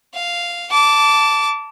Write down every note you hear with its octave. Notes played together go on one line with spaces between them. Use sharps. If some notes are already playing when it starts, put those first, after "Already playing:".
F5
A5 D6